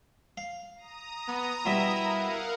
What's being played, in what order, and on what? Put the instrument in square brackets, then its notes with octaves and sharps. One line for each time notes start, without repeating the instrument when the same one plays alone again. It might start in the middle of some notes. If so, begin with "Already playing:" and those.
[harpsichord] F5
[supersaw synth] A#5 D#6
[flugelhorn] B3
[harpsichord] B2 G3 E5 [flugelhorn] E4
[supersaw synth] A#4 F5 F#5